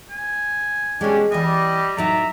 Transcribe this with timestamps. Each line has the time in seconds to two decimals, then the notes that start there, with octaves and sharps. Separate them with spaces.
0.10 G#5
1.01 B2 G#3 C#4 D4 G4
1.32 E3 G3 D#5 E5
1.97 A2 F#3 D#4 D5 E5 A#5